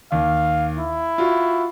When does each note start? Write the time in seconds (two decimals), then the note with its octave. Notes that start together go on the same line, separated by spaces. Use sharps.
0.12 D#2 F5
0.77 E4
1.18 F4 F#4